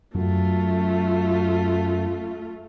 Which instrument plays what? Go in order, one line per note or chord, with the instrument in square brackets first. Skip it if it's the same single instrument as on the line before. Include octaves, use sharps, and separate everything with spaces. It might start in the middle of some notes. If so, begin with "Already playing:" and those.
[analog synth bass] F#2 [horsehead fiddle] A3 F4